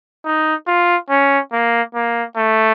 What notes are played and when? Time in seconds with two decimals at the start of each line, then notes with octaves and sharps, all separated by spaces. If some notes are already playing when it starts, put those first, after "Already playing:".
0.25 D#4
0.67 F4
1.10 C#4
1.52 A#3
1.94 A#3
2.36 A3